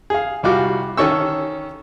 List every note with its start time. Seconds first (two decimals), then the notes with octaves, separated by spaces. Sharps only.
0.10 G#4 F5
0.43 C2 G3 F4 F#4 D6
0.97 D#3 C#4 A4 C#6 E6